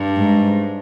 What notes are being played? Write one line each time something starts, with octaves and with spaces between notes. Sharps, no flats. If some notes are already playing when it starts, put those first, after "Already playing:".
Already playing: G2
G#2